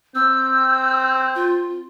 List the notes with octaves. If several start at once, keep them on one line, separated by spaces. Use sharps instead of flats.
C4 E6 G6
F4